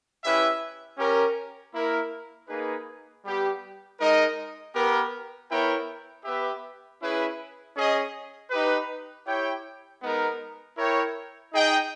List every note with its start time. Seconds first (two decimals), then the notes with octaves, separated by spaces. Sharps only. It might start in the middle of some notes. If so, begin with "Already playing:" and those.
0.23 C#4 E4 G4 B4 E5
0.98 C#4 G4 A#4
1.73 A#3 E4 A#4
2.49 A#3 D#4 G#4 B4
3.23 G3 B3 G4
3.98 G#3 D#4 A#4 D#5
4.73 B3 G4 A#4
5.50 B3 E4 A#4 C#5 G5
6.24 B3 G4 B4 E5
7.00 C#4 E4 G#4 B4
7.76 C#4 G#4 D#5
8.50 D#4 G4 B4
9.26 E4 G4 C#5 G5
10.02 G#3 B3 D#4 A#4
10.76 E4 A#4 C#5 G5
11.52 D#4 G#4 D#5 G5